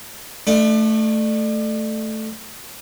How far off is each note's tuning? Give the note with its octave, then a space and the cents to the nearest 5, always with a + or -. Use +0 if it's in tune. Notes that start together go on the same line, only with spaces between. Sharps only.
A3 +0 D4 +35